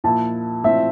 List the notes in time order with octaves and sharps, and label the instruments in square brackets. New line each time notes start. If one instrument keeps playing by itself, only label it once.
[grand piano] A#2 F3 A#3 E4 [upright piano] A5
[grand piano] A2 F3 C4 [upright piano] E5